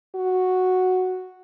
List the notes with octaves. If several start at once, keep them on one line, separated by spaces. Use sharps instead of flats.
F#4